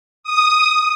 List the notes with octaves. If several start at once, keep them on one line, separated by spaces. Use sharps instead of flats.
D#6